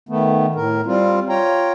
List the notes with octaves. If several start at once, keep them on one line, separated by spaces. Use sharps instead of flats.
D#3 A3 B3
A2 A#4
G3 C4 F4
F4 C#5 G5 A#5